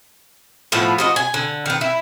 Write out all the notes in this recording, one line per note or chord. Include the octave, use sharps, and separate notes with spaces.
A2 F3 B3
F3 F#4 D#5
G#5
D3
D#3 B4
E4